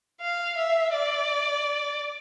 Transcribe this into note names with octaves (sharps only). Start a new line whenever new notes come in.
F5
E5
D5